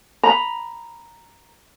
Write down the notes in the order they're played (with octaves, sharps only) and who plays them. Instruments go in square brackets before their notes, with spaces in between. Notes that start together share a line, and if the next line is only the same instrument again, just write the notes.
[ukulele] A#5 B5